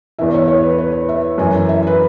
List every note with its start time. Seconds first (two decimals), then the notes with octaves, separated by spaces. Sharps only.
0.19 E2 E3 E5
0.34 C#5
0.48 C#5
0.63 B4
0.78 B4
1.09 E5
1.38 F#2 E3 G#5
1.69 E5
1.87 B4